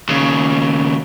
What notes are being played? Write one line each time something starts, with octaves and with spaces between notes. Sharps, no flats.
D#2 C#3